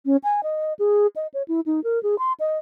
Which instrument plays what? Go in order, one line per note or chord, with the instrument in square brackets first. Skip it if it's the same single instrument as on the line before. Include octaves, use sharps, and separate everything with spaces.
[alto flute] C#4
G#5
D#5
G#4
D#5
C#5
E4
D#4
A#4
G#4
C6
D#5